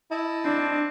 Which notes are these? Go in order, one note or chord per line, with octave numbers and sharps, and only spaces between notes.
E4 D#5 A5
C4 D4